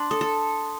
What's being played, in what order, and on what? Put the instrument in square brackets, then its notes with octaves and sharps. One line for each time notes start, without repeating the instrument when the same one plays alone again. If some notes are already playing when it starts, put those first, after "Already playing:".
Already playing: [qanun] D4 [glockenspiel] C6
[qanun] A4 [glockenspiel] D#6
[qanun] A4